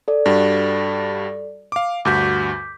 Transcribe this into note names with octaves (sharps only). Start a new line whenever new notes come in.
A4 D5
G2 G3 F#4
F5 D6
D2 G2 F#4 D6 G6 B6